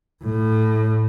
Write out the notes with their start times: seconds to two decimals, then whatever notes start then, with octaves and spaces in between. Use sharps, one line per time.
0.24 A2